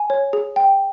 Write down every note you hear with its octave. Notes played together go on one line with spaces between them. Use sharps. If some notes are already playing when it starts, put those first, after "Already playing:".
Already playing: G#5
C#5
G#4
G5